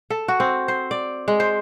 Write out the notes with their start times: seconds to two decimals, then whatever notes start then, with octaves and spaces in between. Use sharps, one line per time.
0.10 A4
0.28 F#4
0.40 C4
0.68 C5
0.91 D5
1.28 G#3
1.40 C5